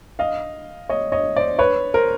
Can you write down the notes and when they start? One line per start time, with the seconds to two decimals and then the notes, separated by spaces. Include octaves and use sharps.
0.19 D#5 F5
0.89 C#5 D#5
1.12 C#5 D#5
1.36 C5 D5
1.59 B4 C#5
1.94 A#4 C5